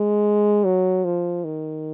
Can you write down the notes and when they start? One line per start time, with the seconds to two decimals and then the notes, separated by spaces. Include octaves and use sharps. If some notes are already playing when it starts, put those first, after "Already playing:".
Already playing: G#3
0.65 F#3
1.05 F3
1.45 D#3